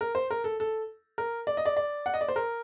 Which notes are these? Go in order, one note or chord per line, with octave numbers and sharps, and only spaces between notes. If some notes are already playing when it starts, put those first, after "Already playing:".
A#4
C5
A#4
A4
A4
A#4
D5
D#5
D5
D5
F#5
D#5
D5
C5
A#4